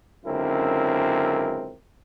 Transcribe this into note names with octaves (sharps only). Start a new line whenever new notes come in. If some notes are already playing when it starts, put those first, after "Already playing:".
C#2 F#2 D3 C4 E4 A#4